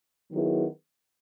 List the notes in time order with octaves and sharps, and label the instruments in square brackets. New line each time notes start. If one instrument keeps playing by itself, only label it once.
[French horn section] D#3 F#3 B3 E4 G#4